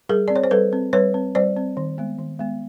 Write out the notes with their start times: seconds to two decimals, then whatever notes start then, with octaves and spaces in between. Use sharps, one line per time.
0.09 G3 G#4 A#4
0.28 C4 D5
0.36 C#5
0.44 C5
0.51 G3 A4 B4
0.73 C4
0.93 G3 B4 C#5
1.14 C4
1.35 G3 C5 D5
1.57 C4
1.77 D#3
1.98 G#3 B3
2.19 D#3
2.39 G#3 B3